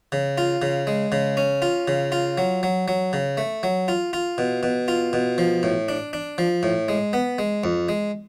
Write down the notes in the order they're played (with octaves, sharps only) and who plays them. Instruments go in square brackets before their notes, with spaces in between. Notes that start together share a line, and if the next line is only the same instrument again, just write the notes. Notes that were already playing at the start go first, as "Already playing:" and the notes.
[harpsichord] C#3
F4
C#3
G#3
C#3
C#4
F4
C#3
F4
F#3
F#3
F#3
C#3
A3
F#3
F4
F4
B2
B2
F4
B2
F3
A2
D4
D4
F3
A2
G#3
B3
G#3
F2
G#3